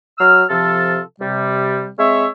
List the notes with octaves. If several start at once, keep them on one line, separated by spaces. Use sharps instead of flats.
F#3 E6 F6
C3 F3 F4 A4
C3 G3
G#3 C4 C#5 E5